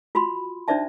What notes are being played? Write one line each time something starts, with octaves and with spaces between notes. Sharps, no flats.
F4 F#4 B5 C6
D4 D#4 C5 D5 E5 A5